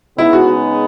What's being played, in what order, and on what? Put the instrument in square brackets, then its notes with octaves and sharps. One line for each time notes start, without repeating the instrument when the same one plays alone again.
[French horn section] C#3 G#3 B3 D#4 [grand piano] E4
[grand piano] F#4